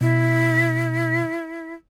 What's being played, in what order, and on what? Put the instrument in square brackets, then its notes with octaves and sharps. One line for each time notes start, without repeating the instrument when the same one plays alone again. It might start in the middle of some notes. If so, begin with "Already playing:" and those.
[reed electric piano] B2 [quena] E4